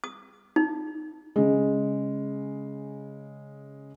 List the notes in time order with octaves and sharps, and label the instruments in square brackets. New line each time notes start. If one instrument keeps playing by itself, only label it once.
[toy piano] D#6
D#4
[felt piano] C#3 G#3